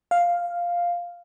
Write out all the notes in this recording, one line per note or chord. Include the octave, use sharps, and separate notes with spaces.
F5